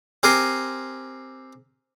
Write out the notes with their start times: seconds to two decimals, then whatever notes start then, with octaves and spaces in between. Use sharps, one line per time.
0.23 C4 G4 A#4 G#5 C6